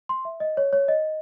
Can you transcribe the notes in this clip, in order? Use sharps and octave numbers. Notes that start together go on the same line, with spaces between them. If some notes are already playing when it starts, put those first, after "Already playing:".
C6
E5
D#5
C#5
C#5
D#5